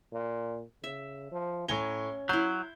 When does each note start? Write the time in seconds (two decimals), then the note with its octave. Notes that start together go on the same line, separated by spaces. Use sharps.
0.13 A#2
0.84 C#3 E5
1.32 F3
1.68 A2 C#4 C#5 G#5 A#5 G7
2.29 F#3 E4 C6 G6